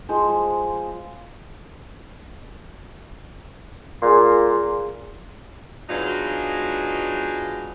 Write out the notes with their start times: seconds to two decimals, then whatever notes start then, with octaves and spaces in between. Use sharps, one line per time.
0.09 F3 G#3 C5
4.02 A#2 G#4 C6
5.89 F#3 G#3 B3 D4 D#4 F4